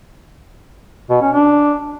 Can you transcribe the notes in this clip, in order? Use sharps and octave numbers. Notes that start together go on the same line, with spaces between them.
B2
C#4
D4